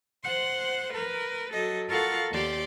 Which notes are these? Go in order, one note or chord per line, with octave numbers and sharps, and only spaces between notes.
C5 F#5 C6
A#4 B4
F#3 A4 D#5
F4 A4 A#4 F5 F#5 C#6
D#2 G4 D5 C6